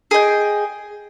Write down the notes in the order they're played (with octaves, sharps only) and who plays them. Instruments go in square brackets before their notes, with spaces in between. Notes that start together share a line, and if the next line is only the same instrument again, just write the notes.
[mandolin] G#4 D#5 G5